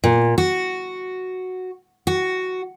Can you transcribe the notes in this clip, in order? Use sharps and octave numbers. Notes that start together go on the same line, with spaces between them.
A#2
F#4
F#4